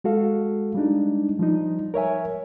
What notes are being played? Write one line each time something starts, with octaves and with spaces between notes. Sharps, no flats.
G#3 F#4 A4 F5
G3 G#3 D4 D#4
F3 G3 D#4
A#4 C#5 E5 G#5